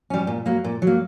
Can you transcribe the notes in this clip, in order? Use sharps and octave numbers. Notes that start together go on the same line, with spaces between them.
G3 C#4
A#2
F#3 A#3
A#2
F#3
A#3